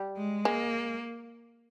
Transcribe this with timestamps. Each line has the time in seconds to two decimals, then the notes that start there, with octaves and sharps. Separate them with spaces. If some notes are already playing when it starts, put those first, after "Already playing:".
Already playing: G3
0.16 G#3
0.45 G#3 A#3